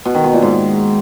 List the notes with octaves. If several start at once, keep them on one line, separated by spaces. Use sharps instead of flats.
B2
D#3
B2
A#2
G#2